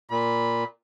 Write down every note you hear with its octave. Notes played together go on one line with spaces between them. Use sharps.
A#2 B5